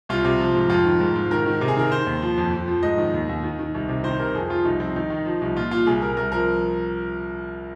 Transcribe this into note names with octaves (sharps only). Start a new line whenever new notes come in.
C2 F4
C3
F3
G#2
F2 F4
D#3
G#2
G#2
D#3 A#4
D#3
C3
G#4
D#3 A#4
D#3 C5
D#2
F3
F2
F2
F3
G#2 D#5
D#3
D#2
D#2
D#3
D#3
C2
C3
D#3 C5
C3 A#4
F2 G#4
F3 F4
C2 D#4
F3 C4
D#3 D#4
D#3
F3
C2
A#2 F4
A#2 F4
C2 G#4
C2 A#4
C2 A#4
F3 A#4